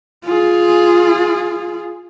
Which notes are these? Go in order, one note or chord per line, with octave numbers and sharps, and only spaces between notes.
F4 G#4